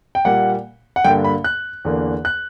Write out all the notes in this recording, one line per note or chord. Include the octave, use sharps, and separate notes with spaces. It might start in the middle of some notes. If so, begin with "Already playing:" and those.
G5
A#2 G3 A#3 F#5
F#5
G2 D3 A#3 G5
B5
F#6
E2 D3 A#3
F#6